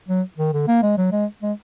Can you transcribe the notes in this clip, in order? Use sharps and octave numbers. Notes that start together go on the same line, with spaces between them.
F#3
D#3
D3
A#3
G#3
F#3
G#3
G#3